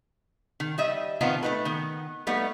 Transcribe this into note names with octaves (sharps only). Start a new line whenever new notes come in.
D#3
G3 D#5 E5
D#3 F3 B3 C4 D#4 F4
A3 D#4 B4
D#3 B3
G3 A3 B3 D#4